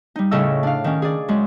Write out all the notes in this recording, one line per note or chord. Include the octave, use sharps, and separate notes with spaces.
G3 D#4
A2 C#3 A4 D#5 E6
D4 F5
D#3 C#4
G#4 D5
F#2 G#3